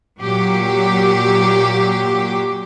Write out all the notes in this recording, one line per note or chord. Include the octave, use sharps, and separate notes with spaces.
A#2 F#3 G4